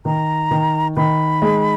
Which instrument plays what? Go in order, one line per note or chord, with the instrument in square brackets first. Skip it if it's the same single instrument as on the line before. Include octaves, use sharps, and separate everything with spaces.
[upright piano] D#3 [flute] A#5
[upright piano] D#3
[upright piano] D#3 [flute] B5
[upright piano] G#3